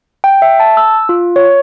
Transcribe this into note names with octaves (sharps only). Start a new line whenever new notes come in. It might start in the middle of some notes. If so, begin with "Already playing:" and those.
G5
E5
A5
E6
F4
C#5